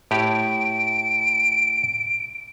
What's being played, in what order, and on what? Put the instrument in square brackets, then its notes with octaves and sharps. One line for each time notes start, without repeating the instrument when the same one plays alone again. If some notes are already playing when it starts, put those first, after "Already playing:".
[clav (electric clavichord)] A2 G4 [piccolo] D7